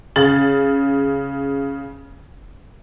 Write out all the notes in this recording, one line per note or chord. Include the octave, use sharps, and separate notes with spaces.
C#3 A6 F#7